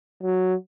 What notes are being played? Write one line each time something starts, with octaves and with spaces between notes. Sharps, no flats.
F#3